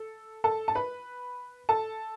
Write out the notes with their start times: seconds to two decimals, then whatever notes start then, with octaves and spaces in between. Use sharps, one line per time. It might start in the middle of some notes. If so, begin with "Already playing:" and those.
Already playing: A4
0.44 A4 A5
0.68 A5
0.75 B4 B5
1.69 A4 A5